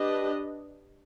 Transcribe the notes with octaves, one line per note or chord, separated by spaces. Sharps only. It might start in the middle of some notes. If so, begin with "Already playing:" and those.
Already playing: D4 G4 B4 D#5